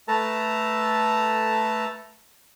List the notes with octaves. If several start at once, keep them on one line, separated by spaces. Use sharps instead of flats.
A3 A4 B4 A5 A#5